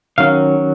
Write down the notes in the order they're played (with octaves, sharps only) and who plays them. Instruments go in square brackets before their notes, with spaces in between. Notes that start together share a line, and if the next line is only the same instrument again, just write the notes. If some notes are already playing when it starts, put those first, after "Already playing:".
[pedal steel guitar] D#3 F#3 C#4 F5